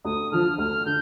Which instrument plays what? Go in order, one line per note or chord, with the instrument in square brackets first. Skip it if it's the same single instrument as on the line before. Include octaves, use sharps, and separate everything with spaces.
[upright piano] D2 [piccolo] D#6
[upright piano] D3 F3 [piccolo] F6
[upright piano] D2 [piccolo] F6
[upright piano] D3 [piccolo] G6